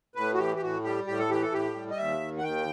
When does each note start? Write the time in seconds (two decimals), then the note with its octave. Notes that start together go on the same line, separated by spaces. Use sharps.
0.15 A2 B4
0.34 F#4
0.38 E3 G4
0.56 G4
0.62 A2 F#4
0.84 G3 G4
1.07 A2 G4
1.19 A4
1.30 E3 G4
1.42 A4
1.52 A2 G4
1.75 G3
1.91 D#5
1.98 D#2 E5
2.20 D#3
2.38 F#5
2.43 D#2 G5